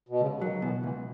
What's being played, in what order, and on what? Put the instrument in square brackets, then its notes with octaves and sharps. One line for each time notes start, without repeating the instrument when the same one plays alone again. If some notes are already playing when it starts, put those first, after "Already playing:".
[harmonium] B2
[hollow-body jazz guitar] C#2 [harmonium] C#3
[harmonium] D#3 [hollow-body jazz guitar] F#3
[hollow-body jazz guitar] B2 [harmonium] E3
[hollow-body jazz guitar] C#2 [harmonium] E3